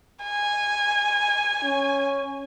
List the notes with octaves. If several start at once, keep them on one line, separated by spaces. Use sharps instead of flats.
G#5
C#4